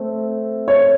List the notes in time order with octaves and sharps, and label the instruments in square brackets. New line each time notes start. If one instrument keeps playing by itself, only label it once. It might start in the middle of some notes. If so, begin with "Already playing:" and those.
Already playing: [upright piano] A3 C4
C#5